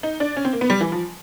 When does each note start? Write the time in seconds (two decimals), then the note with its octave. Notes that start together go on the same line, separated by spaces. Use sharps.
0.03 D#4
0.20 D4
0.36 C#4
0.45 C4
0.53 A#3
0.61 B3
0.70 G3
0.81 E3
0.92 F3